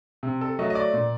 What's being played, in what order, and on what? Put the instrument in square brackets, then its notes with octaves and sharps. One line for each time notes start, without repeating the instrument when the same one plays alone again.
[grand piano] C3
A4
F#3 A3 D#5
D#5
D5
A#2